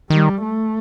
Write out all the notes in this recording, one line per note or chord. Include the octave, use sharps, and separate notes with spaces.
D#3 G3
A3